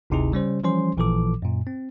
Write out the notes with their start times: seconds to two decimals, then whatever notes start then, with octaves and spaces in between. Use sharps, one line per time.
0.10 G1 D2 C3 D#4 E4 G#4
0.32 C#3 G3 C#4 C5
0.64 E3 F3 G3 C#4 C5 C6
0.97 A1 A#2 E3 F3 A4 D6
1.42 F#2 A#2
1.67 C4